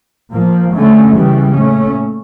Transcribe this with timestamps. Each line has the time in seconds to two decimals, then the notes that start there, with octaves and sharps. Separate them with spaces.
0.31 A#2 F3 A#3
0.73 D3 A3 C#4
1.13 C#3 E3 G3
1.55 A#2 A3 C#4